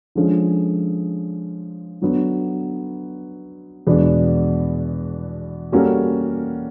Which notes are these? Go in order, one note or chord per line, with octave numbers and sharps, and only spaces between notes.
D3 F3 G#3 C#4
D3 F#3 B3
E2 B2 G#3 B3 D4
G3 A#3 C#4 F#4 A4